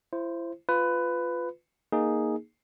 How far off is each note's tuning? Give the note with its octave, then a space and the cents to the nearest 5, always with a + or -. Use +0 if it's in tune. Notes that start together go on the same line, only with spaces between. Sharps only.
E4 +35 C5 +0
F4 +0 B4 +15
A#3 +0 D#4 +0 G#4 +0